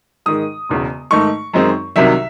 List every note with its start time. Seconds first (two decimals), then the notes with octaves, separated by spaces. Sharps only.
0.26 G#2 D#3 G#3 D#6
0.69 E1 E2 C#3
1.11 G#2 D#3 A3 D#4 C#6
1.53 F#2 D#3 G#3 C4 D#4
1.96 C2 C3 D#3 F#3 E5